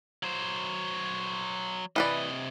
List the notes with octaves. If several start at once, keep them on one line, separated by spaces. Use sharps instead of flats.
F#3 C5
C3 E3 B4 D5 D#5